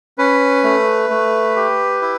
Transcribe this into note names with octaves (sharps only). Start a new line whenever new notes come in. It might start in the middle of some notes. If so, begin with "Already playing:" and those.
C#4 B4
A3
A3
G4
E4